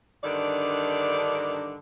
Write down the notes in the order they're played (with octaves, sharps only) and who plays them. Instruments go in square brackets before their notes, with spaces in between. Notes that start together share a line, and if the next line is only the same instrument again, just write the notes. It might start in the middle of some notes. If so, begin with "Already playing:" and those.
[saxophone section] G2 D3 D#3 D5